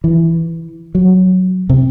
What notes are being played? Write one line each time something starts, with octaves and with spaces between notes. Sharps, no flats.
E3
F#3
C3